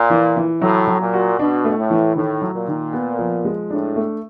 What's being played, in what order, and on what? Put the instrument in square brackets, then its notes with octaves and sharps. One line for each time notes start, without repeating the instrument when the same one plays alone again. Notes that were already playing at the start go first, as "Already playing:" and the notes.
Already playing: [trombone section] A#2
[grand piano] E3
E3
[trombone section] A2 [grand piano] F#3
[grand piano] F#3
[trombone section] A#2
[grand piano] F#4
[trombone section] B2 [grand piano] D4
[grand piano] A3
[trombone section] A2
[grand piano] E3
[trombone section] A2 [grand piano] D#3
[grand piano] F#3
[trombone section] A#2
[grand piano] D#3
B3
F3
G#3
[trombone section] A2 [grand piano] D4
[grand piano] A3